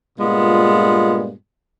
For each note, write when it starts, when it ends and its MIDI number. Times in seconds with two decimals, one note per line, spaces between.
0.18 1.32 43
0.18 1.32 46
0.18 1.32 56
0.18 1.32 59
0.18 1.32 65